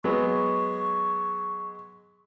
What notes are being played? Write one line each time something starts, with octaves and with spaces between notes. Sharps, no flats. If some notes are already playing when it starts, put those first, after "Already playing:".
F#3 G#3 B3 C#6